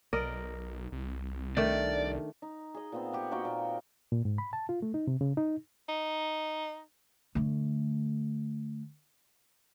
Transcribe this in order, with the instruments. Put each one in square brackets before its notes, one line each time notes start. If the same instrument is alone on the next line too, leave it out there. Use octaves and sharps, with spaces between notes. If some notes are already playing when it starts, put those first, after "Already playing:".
[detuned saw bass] B1 [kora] A#4 D5 D#5
[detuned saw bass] C2
[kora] D#3 A3 D4 [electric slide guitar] D5
[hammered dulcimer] D#4
G#4 D#5
A#2 B3 C4
G4 F#5 G#5
A#3 D#4 F#4 G5
A#2
[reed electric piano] A#2
G#2
B5
A5
F4
A3
D#4
C3
C#3
D#4
[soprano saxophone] D#4
[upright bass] D3 A3